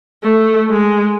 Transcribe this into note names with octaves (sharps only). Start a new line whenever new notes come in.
A3
G#3